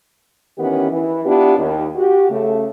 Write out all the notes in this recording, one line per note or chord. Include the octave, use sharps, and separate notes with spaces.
D#3 E3 B3 C#4 G4 A#4
E3
B3 D4 E4 F4 G4
D#2
F#4 G4
C#3 A3